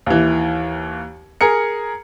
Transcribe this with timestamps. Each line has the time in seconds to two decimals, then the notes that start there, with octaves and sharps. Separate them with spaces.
0.06 D#2 E3
1.41 G#4 A#4 C#7